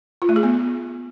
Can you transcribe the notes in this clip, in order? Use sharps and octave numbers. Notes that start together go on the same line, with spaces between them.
F4
A3
G#4
B3